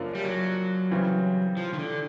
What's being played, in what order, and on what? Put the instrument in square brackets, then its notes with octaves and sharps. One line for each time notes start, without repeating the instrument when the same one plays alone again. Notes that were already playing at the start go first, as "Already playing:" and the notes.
Already playing: [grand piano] F#2 C#3 F3 A#3 D4
[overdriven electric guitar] G3
F#3
[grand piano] C#3 E3 G3 C4
[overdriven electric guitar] F3
D#3
D3